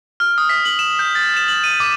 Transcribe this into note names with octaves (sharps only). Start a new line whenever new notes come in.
F6
D#6
B6
F#7
E7
G6
A6
E7
F#7
D#7
D6